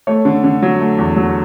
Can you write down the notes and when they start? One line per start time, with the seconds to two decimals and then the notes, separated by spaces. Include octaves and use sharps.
0.07 A3 C#5
0.25 D3
0.44 D3
0.62 F#3
0.80 A3
0.98 E2
1.16 F#3